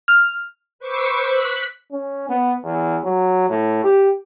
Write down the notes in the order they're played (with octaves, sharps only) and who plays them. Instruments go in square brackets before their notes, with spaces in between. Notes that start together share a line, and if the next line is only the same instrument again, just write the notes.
[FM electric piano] F6
[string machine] B4 C5 C#6 D6 E6
F#6 B6
[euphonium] C#4
B3
E2
F#3
A2
G4